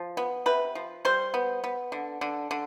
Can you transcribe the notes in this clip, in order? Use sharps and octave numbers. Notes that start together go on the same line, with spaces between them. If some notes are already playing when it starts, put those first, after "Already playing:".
Already playing: F3
B3
C3 B4
F3
G3 C5
B3
B3
D3
D3
D3